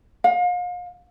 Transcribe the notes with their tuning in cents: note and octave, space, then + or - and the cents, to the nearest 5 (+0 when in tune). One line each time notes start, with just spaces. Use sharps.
F5 +35